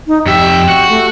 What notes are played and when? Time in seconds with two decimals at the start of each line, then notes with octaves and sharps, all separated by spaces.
0.07 D#4
0.26 F2 G4 E5
0.69 F#4
0.89 A3